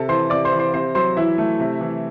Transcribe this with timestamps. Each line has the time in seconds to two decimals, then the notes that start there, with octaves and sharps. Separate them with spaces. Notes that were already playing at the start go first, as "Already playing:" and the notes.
Already playing: C3 A4 A5
0.09 E3 C5 C6
0.30 C3 D5 D6
0.45 C5 C6
0.52 E3
0.59 C5 C6
0.74 C3 C5 C6
0.95 F#3 C5 C6
1.16 E3 E4 E5
1.38 A3
1.59 C3
1.81 E3